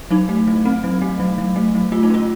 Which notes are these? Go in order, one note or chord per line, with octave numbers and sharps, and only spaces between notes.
F#3 D#4
A3
F#3
C4
F#3
A3
F#3
F#3
A3
F#3
A3 F4
D#4
C#4 F4